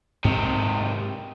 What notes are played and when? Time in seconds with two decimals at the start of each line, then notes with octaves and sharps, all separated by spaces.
0.24 G#2 C3 D#3 C4